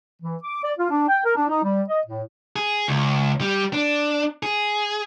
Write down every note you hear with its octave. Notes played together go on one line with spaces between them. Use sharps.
E3
D6
D5
F4
D4
G5
A#4
D4
D#4
G3
D#5
A2
G#4
C#2
G3
D4
G#4